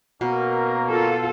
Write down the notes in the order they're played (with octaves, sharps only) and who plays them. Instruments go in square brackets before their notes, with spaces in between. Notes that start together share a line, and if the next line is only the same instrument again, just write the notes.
[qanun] B2 [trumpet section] A#3 C#4 A#4
[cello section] F4 A4